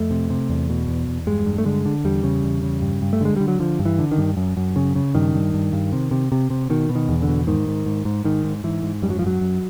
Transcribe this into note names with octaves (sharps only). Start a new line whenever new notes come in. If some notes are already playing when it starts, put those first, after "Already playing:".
Already playing: F2 A3
C3
C3
E2
B2
E2
E2
G2 G#3
G2
A3
D3 G#3
D3
E2 G3
C#3
E2
C#3
G2
G2
A3
D3 G#3
D3 G3
F#3
D3 F3
G2
E3
D3
D#3
G2
F#2
F#2
C#3
C#3
G2 D#3
G2
G2
G2
C3
C3
C3
C3
B2 D#3
B2
D#3
E2
D3
B2
G#2 D#3
G#2
G#2
G#2
G#2 D#3
G#2
G#2 E3
G#2
F#2 G3
F#3
F3
F#2 F#3
F#2